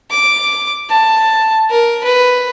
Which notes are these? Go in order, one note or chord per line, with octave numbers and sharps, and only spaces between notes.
D6
A5
A#4
B4